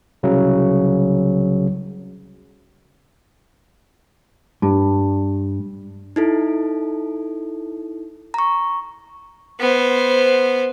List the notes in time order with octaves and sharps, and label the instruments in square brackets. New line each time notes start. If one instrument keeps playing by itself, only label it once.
[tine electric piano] C2 C#3 F#3
[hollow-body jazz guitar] G2
[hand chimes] D#4 E4 A4
A#5 C#6
[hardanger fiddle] B3 C5